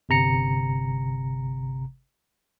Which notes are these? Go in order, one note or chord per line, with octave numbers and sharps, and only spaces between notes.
G1 C3 A#5 C#7